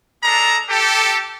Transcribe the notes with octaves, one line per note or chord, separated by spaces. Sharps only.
G#3 D4 A4 A#5
G4 A4